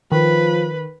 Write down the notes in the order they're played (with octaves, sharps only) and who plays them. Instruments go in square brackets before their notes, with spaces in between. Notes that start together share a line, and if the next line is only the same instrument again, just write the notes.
[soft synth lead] D#3 [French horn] F3 [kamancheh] B4